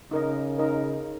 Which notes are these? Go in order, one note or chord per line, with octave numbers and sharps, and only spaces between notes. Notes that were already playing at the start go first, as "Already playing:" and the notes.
C#3 D#4 A#4 D#5
D#4 A#4 D#5